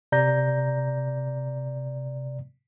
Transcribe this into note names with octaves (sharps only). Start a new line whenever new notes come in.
C3 D5 A#5 G6 A#6